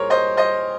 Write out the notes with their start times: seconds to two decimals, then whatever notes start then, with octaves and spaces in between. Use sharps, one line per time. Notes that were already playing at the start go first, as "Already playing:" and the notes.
Already playing: C2 A#2 G#4 A#4 C5 C#5
0.10 C5 D#5
0.37 C5 D#5